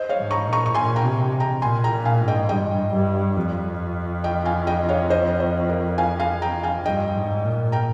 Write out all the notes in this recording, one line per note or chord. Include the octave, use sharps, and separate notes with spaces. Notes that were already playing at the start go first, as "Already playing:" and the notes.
Already playing: C5 D#5
C#5 F5
G#2
A#5 C#6
A#2
A#5 C#6
C#6
A#2 G#5 C6
G5 A#5
C3
G5 A#5
A#2 G#5 C6
G5 A#5
A#2
F5 G#5
G#2
D#5 G5
G2 D#5 G5
G2
F2
D#5 G5
F5 G#5
D#5 G5
C#5 F5
C5 D#5
C5
A#4
F5 G#5
F5 G#5
G5 A#5
F5 G#5
G2 D#5 G5
G#2
A#2
G5 A#5